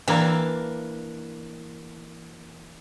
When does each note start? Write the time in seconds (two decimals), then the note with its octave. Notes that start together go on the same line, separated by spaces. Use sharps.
0.08 E3 A#3 D4 G5 A#5